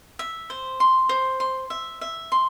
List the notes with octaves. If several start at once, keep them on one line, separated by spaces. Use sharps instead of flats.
E5
C5
C6
C5
C6
E5
E5
C6